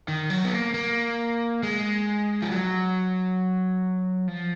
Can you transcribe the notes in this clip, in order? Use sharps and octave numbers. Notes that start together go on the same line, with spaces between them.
D#3
F#3
B3
A#3
A#3
G#3
F3
F#3
F3